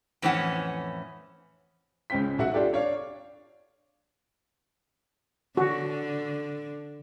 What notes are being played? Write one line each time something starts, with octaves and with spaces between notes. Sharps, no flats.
F2 A2 E3 C#4 F#5
C#2 G#3 C#4 C5 G5 B6
B1 F#4 E5 F#5
D4 F4 G4 A4 D5
D4 C#5 D5 F5
D3 F#4